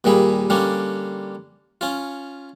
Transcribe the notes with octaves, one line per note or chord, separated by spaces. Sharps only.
D#2 A#2 G3 G#4 B5
D3 G3 A#3 C#4 D4
C#4 F4